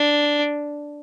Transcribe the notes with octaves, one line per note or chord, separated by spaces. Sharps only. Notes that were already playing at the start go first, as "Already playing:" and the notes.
Already playing: D4